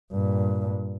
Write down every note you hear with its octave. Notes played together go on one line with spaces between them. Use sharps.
G2 A#2